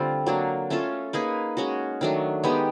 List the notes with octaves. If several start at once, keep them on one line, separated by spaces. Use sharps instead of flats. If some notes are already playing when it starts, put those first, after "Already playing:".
Already playing: D3 G3 A3 C4 F4
F#3 A#3 D4
A3 C#4 F4 A4
A#3 D#4 G#4 B4
G#3 C#4 F#4
D#3 F#3 A3 D4
G#3 B3 D#4 G4